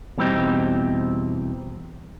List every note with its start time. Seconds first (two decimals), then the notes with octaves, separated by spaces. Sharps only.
0.18 E2 B2 G3 C4 D#4